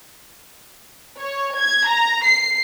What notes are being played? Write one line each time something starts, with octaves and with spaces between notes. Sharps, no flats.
C#5
G#6
A#5
C7